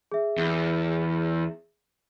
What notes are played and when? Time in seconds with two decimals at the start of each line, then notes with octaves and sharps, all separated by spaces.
0.12 G#4 E5
0.38 E2